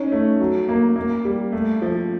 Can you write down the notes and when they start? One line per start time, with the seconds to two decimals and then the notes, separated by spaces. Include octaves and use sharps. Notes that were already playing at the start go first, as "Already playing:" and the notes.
Already playing: C#4 D#4
0.12 A3
0.40 F#3
0.69 A#3
0.96 A#3
1.25 G3
1.52 A3
1.82 F3